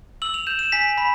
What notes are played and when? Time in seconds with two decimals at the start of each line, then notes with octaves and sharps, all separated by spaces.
0.22 E6 F#7
0.34 F7
0.47 G6 E7
0.59 E7
0.72 G#5 B6
0.98 B5 B6